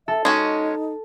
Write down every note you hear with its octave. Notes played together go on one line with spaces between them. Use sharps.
A4 E5
G#3 C#4 D#4 F#4